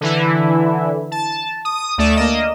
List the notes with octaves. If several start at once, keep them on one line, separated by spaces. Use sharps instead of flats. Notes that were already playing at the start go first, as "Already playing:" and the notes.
D3 E3 E4
A5
D#6
D2 A3 D5 E7
A#3 D#5